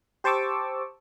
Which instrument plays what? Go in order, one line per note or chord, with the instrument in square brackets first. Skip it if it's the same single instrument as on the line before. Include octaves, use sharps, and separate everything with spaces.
[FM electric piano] G4 C5 A5 C#6 D6 E6